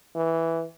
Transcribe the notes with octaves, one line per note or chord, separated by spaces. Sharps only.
E3